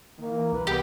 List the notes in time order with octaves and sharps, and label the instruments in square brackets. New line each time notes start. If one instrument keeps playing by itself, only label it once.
[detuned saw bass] D#3 [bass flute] A#3
[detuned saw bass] E3
[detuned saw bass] C2 [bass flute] B4
[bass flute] B3 [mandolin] G4